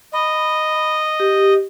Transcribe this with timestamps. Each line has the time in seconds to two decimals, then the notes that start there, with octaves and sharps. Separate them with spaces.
0.13 D#5 B5
1.20 G4